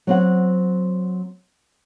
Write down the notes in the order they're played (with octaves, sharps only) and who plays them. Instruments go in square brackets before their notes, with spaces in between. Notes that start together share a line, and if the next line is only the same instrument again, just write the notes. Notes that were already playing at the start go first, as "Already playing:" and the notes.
[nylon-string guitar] F#3 C4 F#5